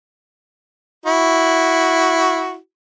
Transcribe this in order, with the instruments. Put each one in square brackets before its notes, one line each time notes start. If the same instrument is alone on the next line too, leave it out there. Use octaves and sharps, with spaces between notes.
[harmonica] E4 F#4